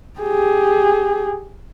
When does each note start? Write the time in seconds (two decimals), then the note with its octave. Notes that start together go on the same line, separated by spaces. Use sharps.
0.20 G4 G#4